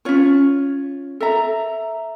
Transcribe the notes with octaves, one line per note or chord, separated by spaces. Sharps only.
C#4 F4 C#5
A4 E5 A#5